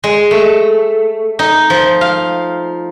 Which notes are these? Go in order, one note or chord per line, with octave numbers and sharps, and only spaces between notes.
G#3
A3
D#4
F3
F5